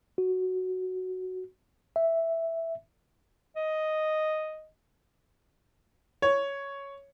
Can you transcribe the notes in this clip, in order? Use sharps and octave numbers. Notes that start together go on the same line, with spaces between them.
F#4
E5
D#5
C#5